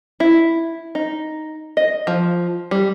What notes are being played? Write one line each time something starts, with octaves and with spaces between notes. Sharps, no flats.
E4
D#4
D#5
F3
G3